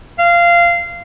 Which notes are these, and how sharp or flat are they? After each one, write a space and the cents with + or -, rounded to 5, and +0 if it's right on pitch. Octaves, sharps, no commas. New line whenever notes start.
F5 -15